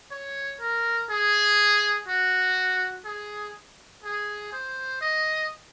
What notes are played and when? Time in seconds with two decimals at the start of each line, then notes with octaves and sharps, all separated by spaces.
0.11 C#5
0.61 A#4
1.10 G#4
2.08 F#4
3.05 G#4
4.04 G#4
4.53 C5
5.01 D#5